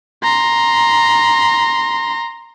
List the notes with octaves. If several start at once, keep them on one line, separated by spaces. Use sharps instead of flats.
A#5 C6